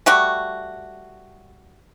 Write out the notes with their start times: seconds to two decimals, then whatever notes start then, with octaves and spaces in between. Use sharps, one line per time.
0.06 G3 A3 F#4